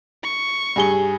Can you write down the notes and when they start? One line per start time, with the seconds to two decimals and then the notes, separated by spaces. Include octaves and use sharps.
0.24 C#6
0.76 G2 G#4 G7